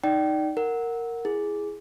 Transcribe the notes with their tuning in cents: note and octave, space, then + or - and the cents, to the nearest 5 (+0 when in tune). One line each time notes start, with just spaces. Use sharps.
D#4 -5 D5 +0 G5 -30
A#4 -10 F#5 -5
E4 +10 G#4 +0